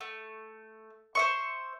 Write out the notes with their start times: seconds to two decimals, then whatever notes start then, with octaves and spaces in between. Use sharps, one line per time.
0.01 A3
1.15 C5 E5 C#6